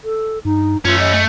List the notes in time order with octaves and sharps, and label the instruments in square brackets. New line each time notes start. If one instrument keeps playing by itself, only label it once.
[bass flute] A4
[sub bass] G2 [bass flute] D#4
[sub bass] F#2 [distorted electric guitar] A3 C#4 [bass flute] F4
[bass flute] D#5
[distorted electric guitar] A3